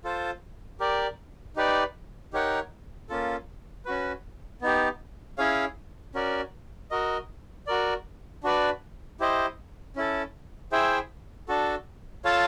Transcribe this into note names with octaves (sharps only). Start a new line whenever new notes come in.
F4 A4 C5
G4 A#4 D5
D#4 G4 B4 D5
D#4 G4 A#4 C#5 F#5
A#3 C#4 F4 A4
C#4 F#4 B4
B3 D#4 G4
C#4 E4 G#4 C#5 F5
C#4 F#4 A#4 D5
F#4 A#4 D#5
F#4 A#4 D5
D4 F#4 B4 D5
E4 G4 C5 D#5
C#4 E4 A4
E4 G#4 C5 E5 G5
D4 F#4 A4
F4 A4 C#5 F5 A5